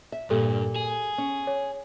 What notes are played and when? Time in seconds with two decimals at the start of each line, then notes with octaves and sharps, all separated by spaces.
0.12 E5
0.30 G2 A#2 G4 A4
0.76 G#4
1.18 C#4
1.47 C#5